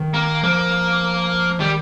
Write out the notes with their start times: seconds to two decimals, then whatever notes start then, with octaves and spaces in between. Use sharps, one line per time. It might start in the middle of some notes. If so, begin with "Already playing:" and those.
Already playing: D#3
0.14 A#3
0.43 F3 A#3
1.59 D#3 G3